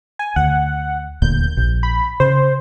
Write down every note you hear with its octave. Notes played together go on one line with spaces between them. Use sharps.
G#5
D2 F#5
D#1 D2 A#2 G6
A#1
B5
C#3 C5